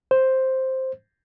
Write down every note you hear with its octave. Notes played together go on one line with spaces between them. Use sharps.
C5